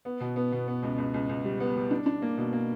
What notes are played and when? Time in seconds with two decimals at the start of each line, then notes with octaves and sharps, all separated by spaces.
0.05 B3
0.20 B2
0.36 B3
0.52 B2
0.68 B3
0.83 C#2
0.98 C#2
1.14 C#2
1.29 C#2
1.45 G3
1.60 B3
1.76 G3
1.91 D4
2.06 D4
2.22 A#3
2.38 B2
2.53 A#3